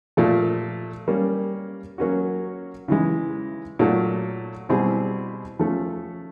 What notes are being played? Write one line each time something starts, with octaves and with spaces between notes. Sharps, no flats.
A#2 F3 A3
G3 A#3 C#4
F#3 A#3 C#4 F#4
C#3 E3 G#3
A#2 F#3 A3
B2 G3 C4 E4 G#4
F3 A3 C#4